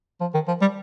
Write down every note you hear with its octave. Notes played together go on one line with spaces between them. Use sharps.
F3
D#3
F3
G3